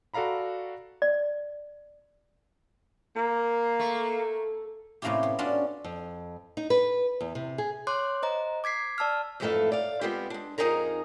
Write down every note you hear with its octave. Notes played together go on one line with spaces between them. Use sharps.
F#4 A4 D5 F5 A#5 B5
D5
A#3
A3
A2 C3 A#3 C#4 E4 G4
B3
C#4 D4 F4 F#4 A4
F2
D#4
B4
E2
C3
G#4
C#5 C6 D6 F#6
C5 D#5 A#5
D6 G#6 B6 C7
D5 A5 E6 F6
F2 G#2 E3 A3 A4 F5
D5 F5
G#3 B3 C4 F4 G4
G#3 D4
F2 D3 D#4 G#4 A#4 A#5